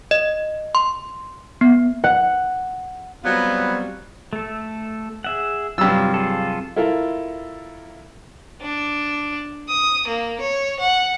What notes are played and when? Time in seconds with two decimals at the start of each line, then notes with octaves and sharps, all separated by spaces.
0.11 D#5
0.75 C6
1.61 B3
2.04 F#5
3.24 F#3 G3 B3 C4 F4
4.33 A3 A4
5.24 G#4 E5 F#5
5.78 G2 C3 F#3 F4 E6
6.14 F4 G#4 A4
6.76 E4 F4 A4 A#4
8.62 D4
9.68 D#6
10.08 A#3
10.40 C#5
10.79 F#5